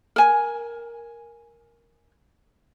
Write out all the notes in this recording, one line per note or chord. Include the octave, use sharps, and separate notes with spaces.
A#4 G#5